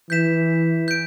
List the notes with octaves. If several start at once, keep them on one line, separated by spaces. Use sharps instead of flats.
E3 G6 B6 E7
G6 D7